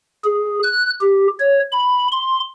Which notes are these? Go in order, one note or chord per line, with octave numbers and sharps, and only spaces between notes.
G#4
F#6
G4
C#5
B5
C6